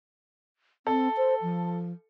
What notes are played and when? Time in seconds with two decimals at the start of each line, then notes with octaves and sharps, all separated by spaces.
0.87 C4 A4
1.17 C5
1.42 F3